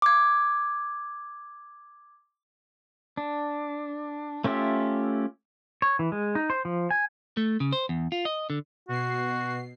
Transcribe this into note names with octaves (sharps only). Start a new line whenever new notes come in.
D6 G#6
D4
A3 C#4 F4 G4 E5
C#5
E3
G#3
D#4
C5
F3
G#5
A3
C#3
C5
E2
F4
D#5
D3
B2 F#4 C7